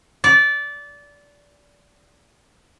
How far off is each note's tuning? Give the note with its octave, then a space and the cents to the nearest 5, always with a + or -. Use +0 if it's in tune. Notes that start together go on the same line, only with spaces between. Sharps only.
D5 -20